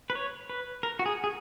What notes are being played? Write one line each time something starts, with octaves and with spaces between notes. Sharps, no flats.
B4
C#5
B4
A#4
F#4
G#4
G#4